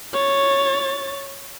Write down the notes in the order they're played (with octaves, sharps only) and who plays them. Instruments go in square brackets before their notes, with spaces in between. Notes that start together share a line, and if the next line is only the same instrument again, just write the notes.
[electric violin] C#5 A6